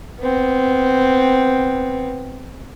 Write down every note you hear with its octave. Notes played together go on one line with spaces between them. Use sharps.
B3 C4